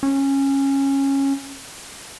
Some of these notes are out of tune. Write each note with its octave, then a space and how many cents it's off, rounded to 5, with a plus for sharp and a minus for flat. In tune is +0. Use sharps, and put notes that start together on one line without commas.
C#4 -15